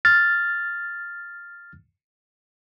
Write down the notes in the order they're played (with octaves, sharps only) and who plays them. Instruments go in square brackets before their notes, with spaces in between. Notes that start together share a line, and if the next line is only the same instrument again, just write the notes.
[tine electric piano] F6 A6